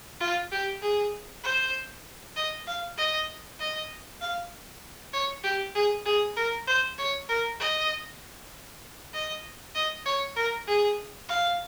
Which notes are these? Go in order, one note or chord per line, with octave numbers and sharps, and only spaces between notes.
F4
G4
G#4
C5
D#5
F5
D#5
D#5
F5
C#5
G4
G#4
G#4
A#4
C5
C#5
A#4
D#5
D#5
D#5
C#5
A#4
G#4
F5